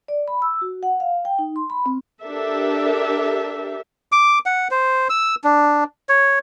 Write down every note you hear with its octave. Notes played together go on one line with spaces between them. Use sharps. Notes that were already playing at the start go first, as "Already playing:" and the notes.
D5
B5
E6
F#4
F#5
F5
G5
D#4
C6
B5
C4
D4 G4 A4 A#4 E5
D6
F#5
C5
E6
D4
C#5